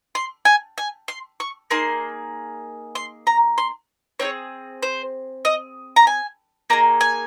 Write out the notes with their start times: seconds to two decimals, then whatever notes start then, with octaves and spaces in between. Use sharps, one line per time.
0.15 C6
0.45 G#5
0.78 G#5
1.08 C6
1.40 C#6
1.71 A#3 D#4 G#4 C6
2.95 C6
3.27 A#5
3.58 C6
4.20 C4 D#4 G#4 C#5
4.82 C5
5.45 D#5
5.96 A#5
6.07 G#5
6.70 A#3 D#4 G#4 A#5
7.01 G#5